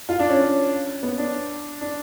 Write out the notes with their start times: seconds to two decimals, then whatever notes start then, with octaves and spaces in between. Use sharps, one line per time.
0.09 F4
0.19 D4
0.30 C#4
0.41 C#4
1.03 B3
1.18 D4
1.81 D4